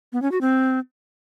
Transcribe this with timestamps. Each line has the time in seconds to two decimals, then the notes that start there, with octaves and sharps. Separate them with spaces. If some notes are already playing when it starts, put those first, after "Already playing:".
0.13 B3
0.22 C#4
0.32 F#4
0.41 C4